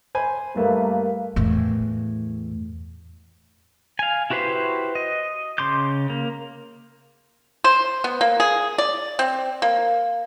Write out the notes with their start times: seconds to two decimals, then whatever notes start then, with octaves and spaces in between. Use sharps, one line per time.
0.15 C5 G#5 B5
0.56 G2 A3 A#3 B4
1.36 E2 A2
3.99 F5 G#5
4.30 E4 F#4 G4 B4 C5
4.95 D#5
5.58 C#3 C6 D6 G6
6.10 A#3
7.64 C5
8.04 B3
8.21 A#3
8.40 G#4
8.78 D5
9.19 C4
9.62 A#3